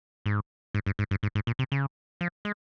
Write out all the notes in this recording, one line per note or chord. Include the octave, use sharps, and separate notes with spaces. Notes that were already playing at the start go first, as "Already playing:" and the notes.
G#2
G#2
G2
G#2
G2
G#2
G#2
A#2
C3
C#3
F3
G#3